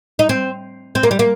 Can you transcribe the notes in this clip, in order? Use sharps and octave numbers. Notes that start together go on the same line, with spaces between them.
D#4
C4
C4
A#3
G3
A#3